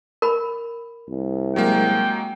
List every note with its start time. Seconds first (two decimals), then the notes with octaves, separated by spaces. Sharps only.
0.22 A#4 B5
1.09 C2
1.56 F#3 G#3 A#3 G5